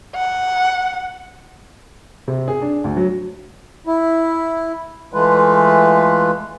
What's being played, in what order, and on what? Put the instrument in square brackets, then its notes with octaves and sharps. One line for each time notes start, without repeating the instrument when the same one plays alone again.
[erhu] F#5
[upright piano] C3
G#4
D4
D2
F#3
[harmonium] E4
E3 G#3 A3 F4 B4